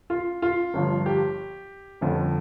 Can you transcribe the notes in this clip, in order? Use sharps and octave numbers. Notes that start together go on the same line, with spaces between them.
F4
F4
G1 G2 F3
G4
G1 F2 D3 F3